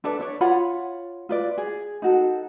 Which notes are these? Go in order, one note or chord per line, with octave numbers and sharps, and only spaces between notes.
D4 A4 B4 D5
B4 C#5 D5
F4 C#5 F#5 B5
F4 B4 D5
G#4
D#4 F#4 A4